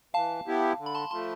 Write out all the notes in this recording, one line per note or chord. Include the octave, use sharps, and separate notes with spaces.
E3 F5 A5
B3 E4 G4
D3
B5
A5 C6
F3 A3 A5 C6